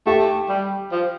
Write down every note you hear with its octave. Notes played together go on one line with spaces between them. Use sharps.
A3 G4
G3
F3